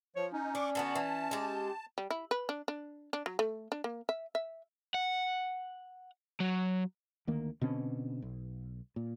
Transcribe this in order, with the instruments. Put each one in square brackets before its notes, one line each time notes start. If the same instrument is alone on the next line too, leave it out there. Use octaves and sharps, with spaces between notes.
[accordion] F3 [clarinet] C#5
[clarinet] C#4 [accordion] D#4
[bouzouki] D4 [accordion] C#6 D6
[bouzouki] D3 B3 F#4 [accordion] A5
[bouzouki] E3
G#3 G4
[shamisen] G3
E4
B4
D4
D4
D4
F#3
A3
D4
A#3
E5
E5
[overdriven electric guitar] F#5
F#3
[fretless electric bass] D2 D#3 A#3
B2 D3 C4 C#4
B1
A#2